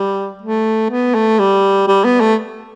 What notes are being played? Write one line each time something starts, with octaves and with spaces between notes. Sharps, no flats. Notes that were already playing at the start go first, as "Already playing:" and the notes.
Already playing: G3
A3
B3
A3
G3
G3
B3
A3